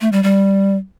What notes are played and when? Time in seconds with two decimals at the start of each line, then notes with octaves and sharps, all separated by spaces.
0.01 A3
0.12 G3
0.23 G3